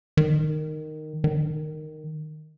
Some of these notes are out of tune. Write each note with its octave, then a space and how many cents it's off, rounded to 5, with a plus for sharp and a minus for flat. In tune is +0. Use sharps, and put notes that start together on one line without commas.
D#3 -10
D#3 -10